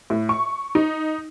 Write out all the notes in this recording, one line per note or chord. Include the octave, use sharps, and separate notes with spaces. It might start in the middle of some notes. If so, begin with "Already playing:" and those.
A2
C#6
D#4